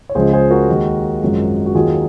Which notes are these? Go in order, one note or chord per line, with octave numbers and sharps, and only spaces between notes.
C#5
C#2 C#3 F3 G#3 G#4 C5
G#4 C5
F#4 A#4
D#2 D#3 G#3
G#1 F#2 F3 G#3
F#4
D#2 D#3 F#3 F4 G#4